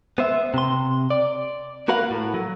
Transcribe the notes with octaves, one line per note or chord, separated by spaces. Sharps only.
B3 C5 E5
C3 C6
D5
A#3 F#4 A#4 B4 F5 F#5
A2
F#3